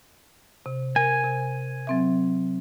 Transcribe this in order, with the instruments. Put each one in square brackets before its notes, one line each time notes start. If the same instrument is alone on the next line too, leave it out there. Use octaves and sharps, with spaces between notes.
[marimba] C3
[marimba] A#4 [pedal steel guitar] G#5
[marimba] C3
F#3 C4 E5